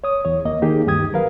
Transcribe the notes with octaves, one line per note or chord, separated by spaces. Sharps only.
C#5 D#6
E2 C#5
D#2 A#3 D#5
D#3 A#3 D#4 G4 G#4
D2 G2 D#3 G4 D#6 G#6
F#3 A#4 B4 F5